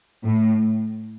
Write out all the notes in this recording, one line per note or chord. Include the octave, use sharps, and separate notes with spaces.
A2